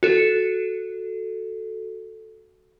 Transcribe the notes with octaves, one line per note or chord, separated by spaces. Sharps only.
F#4 A4